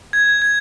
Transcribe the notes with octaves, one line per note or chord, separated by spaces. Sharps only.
G#6
G#6